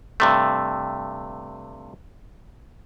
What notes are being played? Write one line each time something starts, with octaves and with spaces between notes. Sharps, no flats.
G2 C3 A3